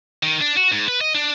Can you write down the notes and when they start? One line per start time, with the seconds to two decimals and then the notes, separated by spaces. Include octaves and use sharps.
0.23 D#3
0.41 D4
0.57 F#4
0.72 G#2
0.88 B4
1.01 D#5
1.15 D4